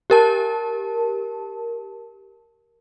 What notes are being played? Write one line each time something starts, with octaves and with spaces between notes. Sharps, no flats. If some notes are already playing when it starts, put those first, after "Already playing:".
G4 A#4 A5